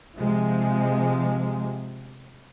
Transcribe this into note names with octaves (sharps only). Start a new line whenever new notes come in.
C3 F3 G#3